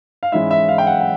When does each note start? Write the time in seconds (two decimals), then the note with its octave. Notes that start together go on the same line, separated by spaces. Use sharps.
0.23 F5
0.32 G#2 E3 G#3 C#4 E4 E5
0.51 E5
0.69 F5
0.78 G5
0.87 F#5
1.00 F#5